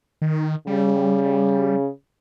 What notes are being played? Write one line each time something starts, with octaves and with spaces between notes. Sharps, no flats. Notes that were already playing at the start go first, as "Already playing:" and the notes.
D#3
C#3 G3